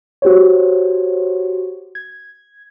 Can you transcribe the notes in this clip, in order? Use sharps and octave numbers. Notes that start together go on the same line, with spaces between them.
F#4 G4 C5 C#5
G#6